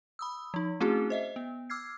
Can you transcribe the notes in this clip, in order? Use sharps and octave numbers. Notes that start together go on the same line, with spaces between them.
B5 D#6 E6
F3 D#4
A3 C4 C#4 E4 F#4 G#4
C5 D#5 E5
B3
D6 E6 F6 G#6 C7